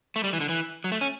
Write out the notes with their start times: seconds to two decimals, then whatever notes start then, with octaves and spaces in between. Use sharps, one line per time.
0.16 A3
0.24 G3
0.33 E3
0.40 D3
0.49 E3
0.84 F#3
0.92 A3
1.01 C#4